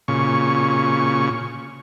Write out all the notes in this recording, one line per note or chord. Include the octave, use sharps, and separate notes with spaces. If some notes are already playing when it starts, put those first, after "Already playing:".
A#2 C#3 C#6